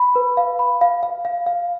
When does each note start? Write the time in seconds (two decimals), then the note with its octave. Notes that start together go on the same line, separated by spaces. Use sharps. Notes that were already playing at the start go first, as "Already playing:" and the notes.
Already playing: B5
0.16 B4
0.37 F5
0.59 B5
0.81 F5
1.03 F5
1.25 F5
1.46 F5